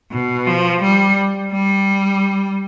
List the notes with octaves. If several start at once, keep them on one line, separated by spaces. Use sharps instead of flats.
B2
F3
G3
G3